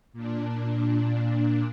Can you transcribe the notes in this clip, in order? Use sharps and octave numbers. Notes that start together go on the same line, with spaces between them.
A#2 D4